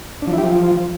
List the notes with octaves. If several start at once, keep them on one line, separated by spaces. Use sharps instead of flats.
D4
F3
E4
G4
F3